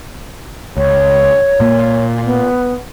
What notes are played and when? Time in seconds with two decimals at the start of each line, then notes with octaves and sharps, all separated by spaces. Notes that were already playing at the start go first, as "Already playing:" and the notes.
0.77 C#2 C#5
1.60 A#2 A#3
2.24 B3